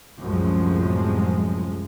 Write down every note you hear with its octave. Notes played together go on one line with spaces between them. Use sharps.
C2 F#2 A2 F3 G#3